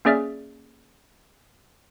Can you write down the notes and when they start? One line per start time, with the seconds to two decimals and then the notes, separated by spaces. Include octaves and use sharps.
0.05 A#3 C#4 G#4 D5 E5 F6